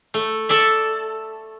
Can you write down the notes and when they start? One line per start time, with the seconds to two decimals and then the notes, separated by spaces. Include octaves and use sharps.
0.14 A3
0.49 A4 D5 E5